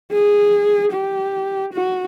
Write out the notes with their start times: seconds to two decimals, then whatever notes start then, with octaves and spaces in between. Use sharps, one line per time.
0.12 G#4
0.93 G4
1.74 F#4